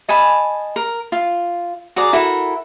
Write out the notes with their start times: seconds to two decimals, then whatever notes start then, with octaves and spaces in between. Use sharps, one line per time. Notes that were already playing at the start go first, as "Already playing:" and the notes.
0.09 D#5 G#5 A5 B5
0.76 A#4
1.12 F4
1.96 F#4 G#4 D5 A#5
2.13 E4 F#4 A4 A#4